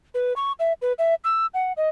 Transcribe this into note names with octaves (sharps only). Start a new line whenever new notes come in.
B4
C#6
E5
B4
E5
E6
F#5
D#5